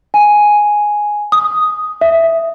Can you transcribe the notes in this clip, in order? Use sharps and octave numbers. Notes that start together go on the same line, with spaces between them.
G#5
D#6
E5